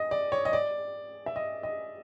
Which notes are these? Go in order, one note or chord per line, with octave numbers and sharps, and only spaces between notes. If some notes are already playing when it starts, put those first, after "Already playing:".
Already playing: D#5
D5
C#5
D#5
D5
E5
D#5
D#5